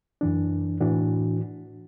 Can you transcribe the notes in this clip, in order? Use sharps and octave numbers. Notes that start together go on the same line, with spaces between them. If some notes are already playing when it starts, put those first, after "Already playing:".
F#2 E3 D4
A2 E3 D4 F#4